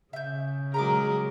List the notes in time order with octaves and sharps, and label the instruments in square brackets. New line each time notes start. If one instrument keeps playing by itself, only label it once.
[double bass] C#3 [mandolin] E5 G6
[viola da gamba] F#3 G#3 A#4 [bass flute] G#4 [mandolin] A#5 B5 D6